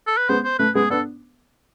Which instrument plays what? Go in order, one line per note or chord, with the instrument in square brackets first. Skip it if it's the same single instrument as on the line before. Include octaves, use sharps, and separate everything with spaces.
[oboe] A4
B4
[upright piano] G#3 B3 [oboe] C5
[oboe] C5
[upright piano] A3 [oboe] B4
[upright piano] G#3 B3 [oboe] G#4
[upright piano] B3 D4 [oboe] A4